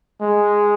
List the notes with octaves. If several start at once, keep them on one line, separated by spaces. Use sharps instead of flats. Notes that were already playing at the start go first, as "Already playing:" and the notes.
G#3